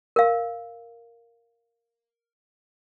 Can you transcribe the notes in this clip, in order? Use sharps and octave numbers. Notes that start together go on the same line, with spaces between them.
A#4 F5